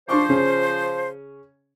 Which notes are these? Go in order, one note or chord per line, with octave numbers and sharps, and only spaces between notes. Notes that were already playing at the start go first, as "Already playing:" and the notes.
F3 D4 C5 C#6 D6
C#3 C#4